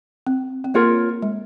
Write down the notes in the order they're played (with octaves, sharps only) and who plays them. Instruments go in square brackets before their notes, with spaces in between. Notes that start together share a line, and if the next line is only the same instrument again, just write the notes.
[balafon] C4
C4
[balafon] A#3 [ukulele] F4 A#4 C#5
[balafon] G#3